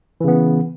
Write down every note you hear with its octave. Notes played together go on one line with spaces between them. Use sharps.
C#3 E3 B3